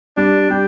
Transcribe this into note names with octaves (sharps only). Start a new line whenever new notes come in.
G3 D4
G3 G4